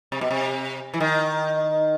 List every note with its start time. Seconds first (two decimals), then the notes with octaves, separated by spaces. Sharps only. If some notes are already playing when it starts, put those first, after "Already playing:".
0.12 C3
0.21 B2
0.31 C3
0.94 E3
1.00 D#3